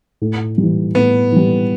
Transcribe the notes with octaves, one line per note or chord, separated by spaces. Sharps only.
A2
G3
E3
A2 B3
E3 G3